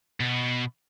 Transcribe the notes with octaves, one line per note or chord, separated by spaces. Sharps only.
B2